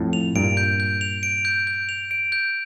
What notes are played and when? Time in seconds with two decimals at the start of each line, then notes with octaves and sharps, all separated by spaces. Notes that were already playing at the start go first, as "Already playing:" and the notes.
Already playing: F2 A2
0.13 F7
0.36 G2 A#2 D7
0.57 G6
0.80 G6
1.01 F7
1.23 D7
1.45 G6
1.67 G6
1.89 F7
2.11 D7
2.32 G6